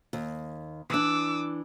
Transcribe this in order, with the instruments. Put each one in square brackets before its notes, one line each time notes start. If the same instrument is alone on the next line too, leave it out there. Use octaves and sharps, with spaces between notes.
[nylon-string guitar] D#2
[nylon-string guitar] E3 D4 [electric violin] D6 E6